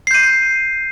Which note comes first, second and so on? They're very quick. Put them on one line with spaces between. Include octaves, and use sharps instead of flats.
C7 G6 D#7